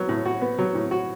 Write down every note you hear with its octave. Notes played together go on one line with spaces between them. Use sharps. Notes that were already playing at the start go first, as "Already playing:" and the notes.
Already playing: F#3 B3
A2
F#4
B3
F#3
A2
F#4